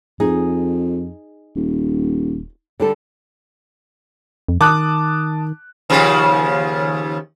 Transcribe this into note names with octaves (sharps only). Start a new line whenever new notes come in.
F2 D#4 G#4
D#1
D3 G3 A4
F2
D#3 A5 D6 D#6 F#6
D#2 C#3 F3